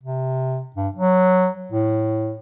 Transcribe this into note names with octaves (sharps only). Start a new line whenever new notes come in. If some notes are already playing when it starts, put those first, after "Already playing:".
C3
G2
F#3
A2